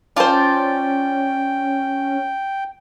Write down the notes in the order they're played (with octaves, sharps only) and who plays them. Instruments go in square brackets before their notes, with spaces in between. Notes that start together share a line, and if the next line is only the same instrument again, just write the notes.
[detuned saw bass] C#4 [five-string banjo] F4 C5 [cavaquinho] D5 A5 [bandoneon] G5